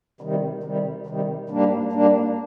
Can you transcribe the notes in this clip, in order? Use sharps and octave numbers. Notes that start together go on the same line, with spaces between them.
C3 D#3 G3
C3 D#3 G3
C3 D#3 G3
G#2 G3 A#3 D4
G#2 G3 A#3 D4